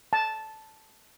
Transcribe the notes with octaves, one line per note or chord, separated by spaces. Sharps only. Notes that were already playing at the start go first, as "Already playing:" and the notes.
A5